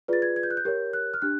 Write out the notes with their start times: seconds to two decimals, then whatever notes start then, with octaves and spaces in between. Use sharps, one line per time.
0.08 F4 G#4 B4 D5 A6
0.22 G#6
0.36 G#6
0.43 G6
0.51 F#6
0.57 G6
0.65 G4 A#4 C#5
0.93 F#6
1.14 F6
1.22 D4 G4 F#6